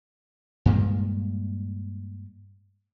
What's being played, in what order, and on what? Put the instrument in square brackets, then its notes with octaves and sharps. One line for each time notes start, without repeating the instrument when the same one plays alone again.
[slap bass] G2 A#2 G3 G#3